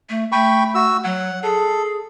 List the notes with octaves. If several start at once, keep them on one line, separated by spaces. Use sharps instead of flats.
A3
A3 G5 B5 C#6
F#4 E6
F#3 F#5
G#4 A4